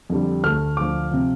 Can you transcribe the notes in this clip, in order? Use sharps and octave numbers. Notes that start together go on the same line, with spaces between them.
F2 D3 G3
D2 D3 A3 F6
D2 D3 F3 D6
C3 F3